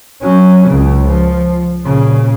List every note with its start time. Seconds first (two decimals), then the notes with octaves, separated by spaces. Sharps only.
0.23 F#3 C#4
0.68 C#2 C#3
1.07 F3
1.84 A#2 C#3